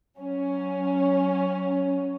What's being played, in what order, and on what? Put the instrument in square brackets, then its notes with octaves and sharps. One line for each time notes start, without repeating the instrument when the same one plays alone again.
[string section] F#3 C#4